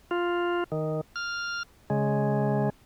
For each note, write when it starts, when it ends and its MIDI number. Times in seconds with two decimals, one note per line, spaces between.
0.11 0.64 65
0.72 1.01 51
1.16 1.63 89
1.90 2.69 49
1.90 2.69 56